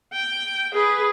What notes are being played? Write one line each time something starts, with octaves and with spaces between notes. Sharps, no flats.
G5
G#4 B4